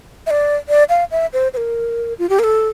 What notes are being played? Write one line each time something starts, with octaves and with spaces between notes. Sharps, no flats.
E5
D5
D5
F5
E5
C5
C5
A#4
F4
G4
A#4
A4